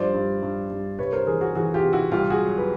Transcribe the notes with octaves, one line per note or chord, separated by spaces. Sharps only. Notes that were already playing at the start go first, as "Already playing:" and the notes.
Already playing: G2 F3 C5 D5
G2
G2
G2
C2 B4 C#5
A#4 C5
E3 G#4 A#4
F#4 G#4
E3 F#4 G#4
F4 G4
C3
E4 F#4
C2 F4 G4
F#4 G#4
F#3
B4